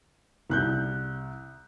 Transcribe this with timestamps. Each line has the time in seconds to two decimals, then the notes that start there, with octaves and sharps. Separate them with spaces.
0.50 C2 F#6 G6